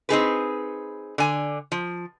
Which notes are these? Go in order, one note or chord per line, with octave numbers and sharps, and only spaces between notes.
C4 D#4 G#4 B4
D3 G#5
F3